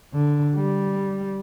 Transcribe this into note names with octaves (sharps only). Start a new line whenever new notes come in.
D3
G3